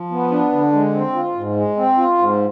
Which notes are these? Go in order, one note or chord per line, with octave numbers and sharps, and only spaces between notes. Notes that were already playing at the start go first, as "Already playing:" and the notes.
Already playing: F3
B3
D4
D3
G#3
C4
F4
G#2
G#3
C4
F4
G#2